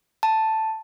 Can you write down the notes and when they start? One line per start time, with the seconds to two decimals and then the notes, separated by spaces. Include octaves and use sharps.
0.23 A5